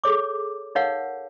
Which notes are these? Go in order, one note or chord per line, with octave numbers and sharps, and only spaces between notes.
G#4 A4 C#5 D6
D#4 A#4 C#5 F5 F#5